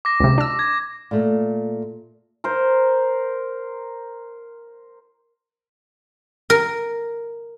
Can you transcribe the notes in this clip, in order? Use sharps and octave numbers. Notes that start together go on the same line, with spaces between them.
D6 A#6
C#2 C3
D4 E6
G#6
A#2 A3
A#4 C5
A#4